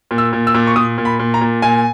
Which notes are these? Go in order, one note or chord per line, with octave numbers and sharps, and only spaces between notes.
A#2
E6
A#2
E6
A#2
C#6
A#2 D#6
A#2
B5
A#2
A#5
A#2
A#2 G#5